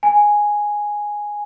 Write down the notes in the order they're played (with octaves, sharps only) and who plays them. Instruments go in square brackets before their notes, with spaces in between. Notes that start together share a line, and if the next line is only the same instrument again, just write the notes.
[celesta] G#5